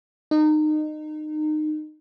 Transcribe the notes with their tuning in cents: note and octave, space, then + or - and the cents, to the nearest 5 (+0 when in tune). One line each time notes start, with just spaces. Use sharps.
D#4 -25